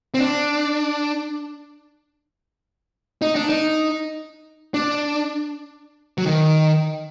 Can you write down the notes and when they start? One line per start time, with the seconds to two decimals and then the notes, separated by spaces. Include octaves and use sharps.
0.14 C4
0.19 D4
3.22 D#4
3.36 D4
3.49 D#4
4.74 D4
6.18 F#3
6.25 D#3